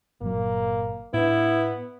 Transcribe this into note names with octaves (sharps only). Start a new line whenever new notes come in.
G1 A#2 F#3 A#3
A2 B3 D4 E4